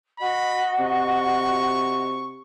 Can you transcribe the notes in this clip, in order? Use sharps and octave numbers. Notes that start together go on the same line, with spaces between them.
F#4 D#5 B5
C3 C#6